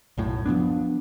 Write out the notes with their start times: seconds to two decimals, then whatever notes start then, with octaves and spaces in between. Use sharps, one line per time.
0.17 B1 F#2 A2
0.46 F3 F#3 B3 D4